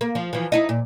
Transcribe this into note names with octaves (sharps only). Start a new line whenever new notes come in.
A#3
F3
E3 F3
D#4 E4 D#5
A#2